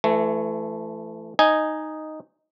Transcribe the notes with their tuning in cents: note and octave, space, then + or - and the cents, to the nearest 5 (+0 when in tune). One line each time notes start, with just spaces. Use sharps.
E3 +30 A3 +0
D#4 -5 D#5 +0 G#5 +0